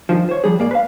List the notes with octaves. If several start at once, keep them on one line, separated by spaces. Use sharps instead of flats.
G2 D#3 F3
C5 C#5
F3 G3 G#4
G#2 A#3 D5
B4 F5